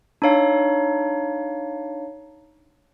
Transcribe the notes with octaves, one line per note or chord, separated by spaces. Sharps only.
D4 D#4 C#5 F5